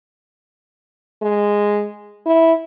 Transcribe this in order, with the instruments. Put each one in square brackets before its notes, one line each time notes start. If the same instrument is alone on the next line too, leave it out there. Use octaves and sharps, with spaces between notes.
[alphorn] G#3
E4